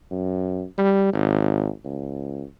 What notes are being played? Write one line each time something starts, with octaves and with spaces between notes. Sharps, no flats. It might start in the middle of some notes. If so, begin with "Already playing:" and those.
F#2
G3
G#1
C#2